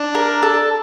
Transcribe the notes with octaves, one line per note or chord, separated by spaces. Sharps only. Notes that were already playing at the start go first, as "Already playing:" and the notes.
Already playing: D4
A#4
A4